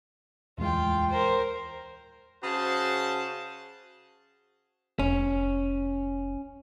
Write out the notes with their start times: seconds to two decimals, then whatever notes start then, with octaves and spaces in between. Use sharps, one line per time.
0.58 D1 E2 G#3 F4 G5
1.10 A#4 C5
2.43 C#3 F#4 G#4 C5 A5
4.99 F1 C#4